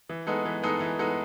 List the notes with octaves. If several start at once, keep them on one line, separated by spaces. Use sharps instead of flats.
E3
G#3 B3 D#4 A4
E3
G#3 B3 D#4 A4
E3
G#3 B3 D#4 A4